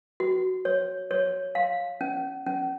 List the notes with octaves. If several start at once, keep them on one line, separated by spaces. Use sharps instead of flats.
F#4
C#5
C#5
F5
C#4
C#4